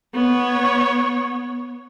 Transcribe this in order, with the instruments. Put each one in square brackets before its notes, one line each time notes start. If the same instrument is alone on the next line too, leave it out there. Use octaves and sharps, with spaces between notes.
[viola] B3 C#5